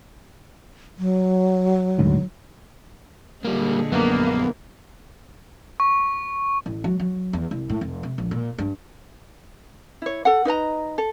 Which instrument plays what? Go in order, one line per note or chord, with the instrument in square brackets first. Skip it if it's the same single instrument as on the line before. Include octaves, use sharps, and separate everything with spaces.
[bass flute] F#3
[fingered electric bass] D#1 D2 G#2
[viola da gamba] A#2 D3 G#3 [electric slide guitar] G3 A#3
[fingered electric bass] A#1 F#2 [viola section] A#3 [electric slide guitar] B3
[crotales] C#6
[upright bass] A1
F#3
F#3
E2
C2
A2
F1
C3
A#1
A#2
G2
[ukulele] E4 C#5
A4 F#5
D#4 B4 D#5 A#5
A4